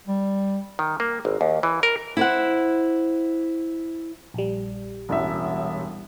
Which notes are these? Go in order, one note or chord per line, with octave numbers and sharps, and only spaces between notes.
G3
D#3
A#3
G#1
D#2
E3
A#4
E4 C5 F#5
A#1 G3
E1 A1 E5